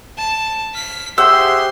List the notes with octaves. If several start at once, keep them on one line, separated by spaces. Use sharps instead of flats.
A5
F6 B6
G4 G#4 C5 E5 F#5 C6 E6